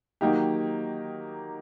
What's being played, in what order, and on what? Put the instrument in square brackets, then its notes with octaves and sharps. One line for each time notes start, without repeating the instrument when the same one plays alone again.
[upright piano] D#3 F#3 A#3 D#4 G4